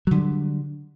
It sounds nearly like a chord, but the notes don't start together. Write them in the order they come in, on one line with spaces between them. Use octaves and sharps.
F#3 D3 G3